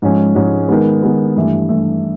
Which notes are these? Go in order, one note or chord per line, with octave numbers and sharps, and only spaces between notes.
G#2 F3 G#3 C#4
G#2 F3 G#3 C#4
D#3 G#3 B3
D#3 G#3 B3
G2 E3 A3
G2 E3 A3